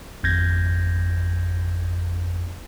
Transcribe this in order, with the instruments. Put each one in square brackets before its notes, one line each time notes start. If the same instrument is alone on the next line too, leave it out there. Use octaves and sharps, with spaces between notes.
[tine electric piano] G#1 F2 G6 G#6 A#6